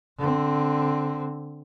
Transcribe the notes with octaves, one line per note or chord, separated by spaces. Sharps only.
D3 C4